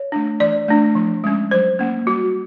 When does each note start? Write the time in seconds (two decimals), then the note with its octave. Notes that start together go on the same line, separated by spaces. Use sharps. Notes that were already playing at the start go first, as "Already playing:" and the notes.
Already playing: C#5
0.12 A3 D4
0.40 E3 D5
0.68 A3 D4
0.95 F3
1.24 G#3 C#4
1.51 F#3 C5
1.79 A#3 C#4
2.07 G3 F#4